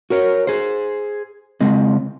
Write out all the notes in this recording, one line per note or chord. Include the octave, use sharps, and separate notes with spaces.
F#4 A#4 C#5
G#4 C5
C#3 G#3 C4